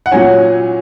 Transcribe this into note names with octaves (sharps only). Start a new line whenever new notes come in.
F#5
A#2 F#3 C#4 G#5